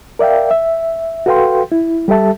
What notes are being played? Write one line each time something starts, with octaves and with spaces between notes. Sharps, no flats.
A#4 D5 E5 F5 G5
E5
F#4 A4 B4 F5 G5 C6
E4
G3 G4 A4 E5 A5